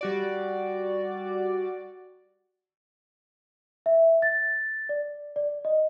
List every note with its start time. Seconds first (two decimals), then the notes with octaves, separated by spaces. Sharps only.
0.01 G3 F#4 D5
3.86 E5
4.22 A6
4.89 D5
5.36 D5
5.65 D#5